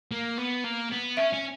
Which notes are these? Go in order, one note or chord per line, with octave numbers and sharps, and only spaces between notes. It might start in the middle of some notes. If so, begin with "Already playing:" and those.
A#3
B3
A#3
B3
C#4 E5
C#4